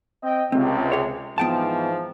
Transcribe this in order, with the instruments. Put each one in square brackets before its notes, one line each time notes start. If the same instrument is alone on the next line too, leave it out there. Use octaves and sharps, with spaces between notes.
[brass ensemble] C4 D#5 G5
[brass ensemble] C#2 C3 [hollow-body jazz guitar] C4
[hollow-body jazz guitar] G#4 C#5
[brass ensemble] G#2 E3 F3 [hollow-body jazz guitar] B3 G5 A5